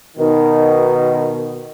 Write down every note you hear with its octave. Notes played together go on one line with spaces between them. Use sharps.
B2 D#3